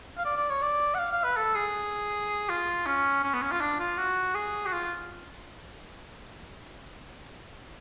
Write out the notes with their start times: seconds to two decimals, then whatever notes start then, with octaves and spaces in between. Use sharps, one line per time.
0.18 F5
0.25 D5
0.37 D5
0.50 C#5
0.62 D5
0.94 F#5
0.99 F5
1.12 F5
1.24 B4
1.37 A4
1.55 G#4
2.49 F4
2.86 C#4
3.23 C#4
3.34 B3
3.42 C#4
3.52 F4
3.61 D4
3.80 F4
3.98 F#4
4.35 G#4
4.66 F#4
4.73 F4